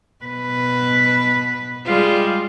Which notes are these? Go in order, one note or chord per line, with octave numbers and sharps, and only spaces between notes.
B2 B4
G3 G#3 F4